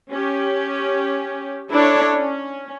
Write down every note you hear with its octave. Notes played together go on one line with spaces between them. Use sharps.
C#4 G4
D4 E4 A4 C#5
C#4